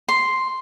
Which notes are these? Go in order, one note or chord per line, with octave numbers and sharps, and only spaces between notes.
C6